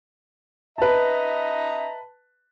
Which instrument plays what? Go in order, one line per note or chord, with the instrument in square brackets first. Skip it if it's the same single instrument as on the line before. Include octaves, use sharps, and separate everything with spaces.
[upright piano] B4 A5 [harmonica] D#5 E5 A#5